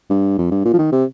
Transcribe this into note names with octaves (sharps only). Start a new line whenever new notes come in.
G2
F2
G2
A#2
F3
D#3
C3